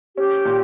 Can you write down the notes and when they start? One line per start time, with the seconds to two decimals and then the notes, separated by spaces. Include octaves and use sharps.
0.17 C#4 G4
0.45 A#2